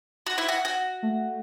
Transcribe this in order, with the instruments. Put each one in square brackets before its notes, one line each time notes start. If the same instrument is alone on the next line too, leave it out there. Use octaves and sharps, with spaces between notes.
[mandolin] F#4
E4
F#4
F#4
[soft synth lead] A3